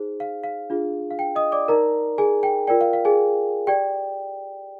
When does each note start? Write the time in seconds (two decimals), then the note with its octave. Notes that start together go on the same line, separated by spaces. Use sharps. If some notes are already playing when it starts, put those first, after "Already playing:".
Already playing: D#4 G#4 C5
0.20 F5
0.44 F5
0.70 D4 F4 G#4
1.11 F5
1.19 G5
1.36 D#5 D#6
1.52 D5 D6
1.68 D#4 A#4 D5 A#5
2.18 G#4 G#5
2.43 G5
2.67 F4 A#4 D5 G5
2.81 F5
2.93 F5
3.05 G#4 G#5
3.67 G4 D5 G5